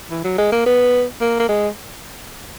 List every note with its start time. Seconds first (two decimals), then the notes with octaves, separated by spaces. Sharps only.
0.10 E3
0.24 F#3
0.38 G#3
0.52 A#3
0.66 B3
1.21 A#3
1.40 A#3
1.49 G#3